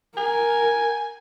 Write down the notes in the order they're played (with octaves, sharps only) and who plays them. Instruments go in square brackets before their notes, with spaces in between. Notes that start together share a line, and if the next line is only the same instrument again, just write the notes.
[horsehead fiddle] A#4 [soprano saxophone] G#5